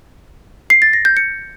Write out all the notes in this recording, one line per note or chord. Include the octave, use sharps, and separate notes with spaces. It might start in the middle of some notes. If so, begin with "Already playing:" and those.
C7
A6
A#6
G6
C#7